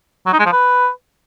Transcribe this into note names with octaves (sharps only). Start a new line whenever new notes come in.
F#3
D#4
G#3
F3
B4